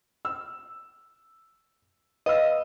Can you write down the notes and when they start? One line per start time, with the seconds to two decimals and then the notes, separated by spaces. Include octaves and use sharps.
0.25 E6
2.26 B4 D#5 F5 E6